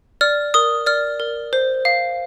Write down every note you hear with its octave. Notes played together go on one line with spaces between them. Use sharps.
D5 F6
A#4 D#6
D5 F6
A#4
C5
F5